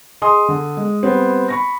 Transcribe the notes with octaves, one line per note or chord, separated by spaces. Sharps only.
G#4 D#5 G#5 C6 D#6
D3
G#3
G3 B3 C4
B5 C#6 A#6